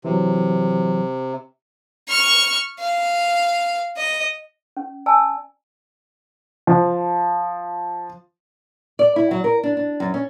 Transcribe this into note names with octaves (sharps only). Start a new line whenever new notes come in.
C3 E3 F#3
C#6 F6
F5
D#5
C#4
D5 G#5 A5 E6
F3
D5
E4
F#3
A#4
D4
D4
F#2
C#4